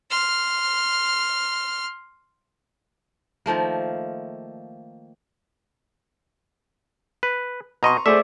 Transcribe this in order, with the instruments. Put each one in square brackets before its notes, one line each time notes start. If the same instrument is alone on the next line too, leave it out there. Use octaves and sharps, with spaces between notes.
[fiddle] C6 F6
[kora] D#3 F3 A3 A#3
[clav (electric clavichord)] B4
[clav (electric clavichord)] B2 D#5 [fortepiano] A#5 C6 C#6
[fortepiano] A3 G#4 C5 [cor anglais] D5 [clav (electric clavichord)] E5